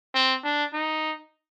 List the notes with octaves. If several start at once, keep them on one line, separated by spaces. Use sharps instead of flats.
C4
D4
D#4